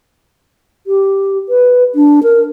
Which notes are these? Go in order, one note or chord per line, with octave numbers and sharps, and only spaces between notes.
G4
B4
D4
A#4